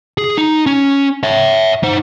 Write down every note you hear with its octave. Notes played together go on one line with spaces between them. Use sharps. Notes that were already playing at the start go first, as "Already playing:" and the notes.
G#4
D#4
C#4
C#5 E5
D#4 C5